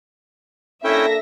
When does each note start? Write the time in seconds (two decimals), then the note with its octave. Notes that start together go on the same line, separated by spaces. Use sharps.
0.84 A#3 C#4 D4 E4 A4 E5 G5 A#6